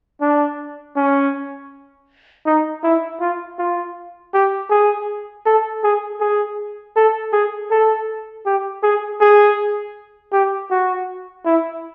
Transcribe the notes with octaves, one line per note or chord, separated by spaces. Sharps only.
D4
C#4
D#4
E4
F4
F4
G4
G#4
A4
G#4
G#4
A4
G#4
A4
G4
G#4
G#4
G4
F#4
E4